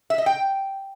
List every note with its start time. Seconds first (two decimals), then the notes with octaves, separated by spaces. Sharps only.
0.10 E5
0.18 D#5
0.26 G5